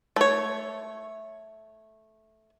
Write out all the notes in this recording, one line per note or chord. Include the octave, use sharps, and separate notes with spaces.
A3 C#5